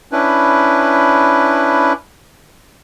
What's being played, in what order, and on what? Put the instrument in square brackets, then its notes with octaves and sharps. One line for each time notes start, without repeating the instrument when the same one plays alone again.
[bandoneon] C#4 D4 E4 B4